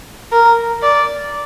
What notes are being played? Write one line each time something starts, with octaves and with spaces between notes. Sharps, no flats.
A#4
D5